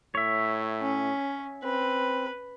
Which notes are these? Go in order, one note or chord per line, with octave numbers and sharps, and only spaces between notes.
A2 C#5 E5
C#4
C4 B4